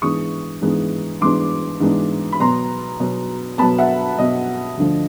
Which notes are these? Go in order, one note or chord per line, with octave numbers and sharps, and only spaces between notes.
G#2 E3 G#3 B3 D4 C#6 D#6
G#2 E3 G#3 B3 D4
G#2 E3 G#3 B3 D4 C6 D6
G#2 E3 G#3 B3 D4
B5
B2 F#3 B3 A#5 C6
B2 F#3 B3
B2 F#3 B3 A5 B5
E5 F#5
B2 F#3 B3 D#5
D2 D3 F3